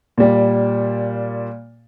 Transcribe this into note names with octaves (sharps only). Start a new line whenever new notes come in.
A#2 G3